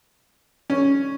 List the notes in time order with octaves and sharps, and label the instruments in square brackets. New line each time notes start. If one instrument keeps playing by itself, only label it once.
[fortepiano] C#4